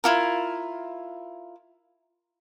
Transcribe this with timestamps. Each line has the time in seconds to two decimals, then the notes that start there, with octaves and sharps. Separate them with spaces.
0.04 E4 F4 A#4